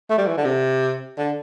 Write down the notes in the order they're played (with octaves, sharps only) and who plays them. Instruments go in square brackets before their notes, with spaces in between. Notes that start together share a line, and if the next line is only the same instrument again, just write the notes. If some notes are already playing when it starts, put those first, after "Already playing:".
[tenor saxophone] A3
G3
E3
D3
C3
D3